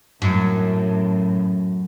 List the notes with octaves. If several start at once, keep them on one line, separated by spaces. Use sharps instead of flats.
F#2 A2